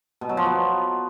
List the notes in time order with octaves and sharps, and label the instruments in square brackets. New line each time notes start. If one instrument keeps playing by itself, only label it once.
[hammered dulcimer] B2
F#3
F3
B3